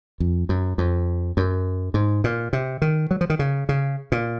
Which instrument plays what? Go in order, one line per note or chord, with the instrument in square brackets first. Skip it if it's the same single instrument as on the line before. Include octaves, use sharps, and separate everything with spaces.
[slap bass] F2
F#2
F2
F#2
G#2
A#2
C3
D#3
F#3
F3
D#3
C#3
C#3
A#2